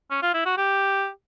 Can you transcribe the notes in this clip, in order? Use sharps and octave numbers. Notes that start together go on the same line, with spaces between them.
C#4
F4
E4
F#4
G4